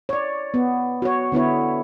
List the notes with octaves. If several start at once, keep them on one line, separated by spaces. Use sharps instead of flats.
C#5 D5
B3
F#4 C#5
D3 B3 E4 C#5